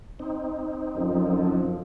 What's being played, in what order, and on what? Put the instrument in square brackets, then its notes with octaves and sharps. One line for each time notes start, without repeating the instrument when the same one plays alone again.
[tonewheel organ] C4 D#4
[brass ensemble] F#2 D3 F3